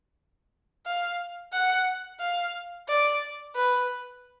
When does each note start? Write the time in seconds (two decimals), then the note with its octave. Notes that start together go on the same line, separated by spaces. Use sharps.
0.86 F5
1.53 F#5
2.20 F5
2.88 D5
3.56 B4